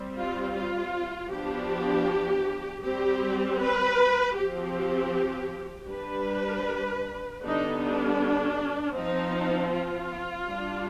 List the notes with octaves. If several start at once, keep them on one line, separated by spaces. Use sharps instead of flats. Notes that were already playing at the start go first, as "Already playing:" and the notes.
Already playing: G3 C4
F4
F4
F3 B3 D4 G4
G3 C4 G4
B4
F3 C4 G4
G3 D4 B4
D3 G3 B3 D4 D#4
D4
F3 C4 D#4
F4
G3 D4